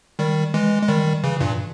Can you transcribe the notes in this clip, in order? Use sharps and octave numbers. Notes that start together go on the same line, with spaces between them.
D#3 G3
E3 G#3
G#3
D#3 G3
C#3 E3
G2 A#2